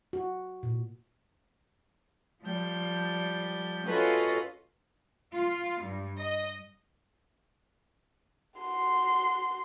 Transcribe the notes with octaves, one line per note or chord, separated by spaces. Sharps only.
F#4
A#2
F3 G3 G6
C#4 F4 F#4 A4 B4 D#5
F4
G2
D#5
F#4 C6